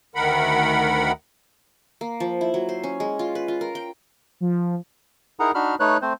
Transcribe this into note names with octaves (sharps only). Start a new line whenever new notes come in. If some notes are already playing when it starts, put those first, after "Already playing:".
D2 D#3 A#4 F#5 B5
A#3
F3
E4
F#3
C5
C#4
G#3
F4
B4
F4
A#4
G5
F3
D#4 E4 G#4 A#4 F#5 A#5
D4 D#4 F#4 B5 F6
A3 D#4 B4 C#5 F#6
A3 C4 C5